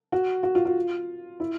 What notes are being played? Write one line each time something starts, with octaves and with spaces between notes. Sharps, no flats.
F#4
F#4
F4
F4
E4